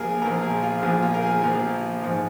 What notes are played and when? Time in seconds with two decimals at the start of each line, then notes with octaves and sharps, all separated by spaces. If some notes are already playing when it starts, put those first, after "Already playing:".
Already playing: A#1 A#2 F3 F4 G#4 A#4
0.22 A#1 A#2 F3 A#4
0.42 G#4
0.63 F4
0.82 A#1 A#2 F3 G#4
1.02 F4
1.14 A#4
1.23 G#4
1.42 A#1 A#2 F3 A#4
2.02 G#2 F3